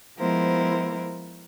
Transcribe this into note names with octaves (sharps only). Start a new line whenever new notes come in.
F3 G#3 B3 E4 A#4 C5